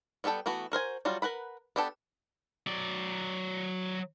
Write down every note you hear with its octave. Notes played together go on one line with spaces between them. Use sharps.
G3 B3 D4 A4 G5
E3 A3 B3 F#4
F#4 A#4 C5 G#5
F#3 G3 F4 F#4
A#4 B4 F#5 B5
B3 D4 G4 A4
F#3 D5